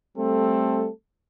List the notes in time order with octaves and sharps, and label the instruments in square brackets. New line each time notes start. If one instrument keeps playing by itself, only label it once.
[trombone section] G3 A3 C4 A4